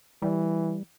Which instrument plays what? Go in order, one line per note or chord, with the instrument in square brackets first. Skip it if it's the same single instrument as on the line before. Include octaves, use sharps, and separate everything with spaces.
[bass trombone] E3 [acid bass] G3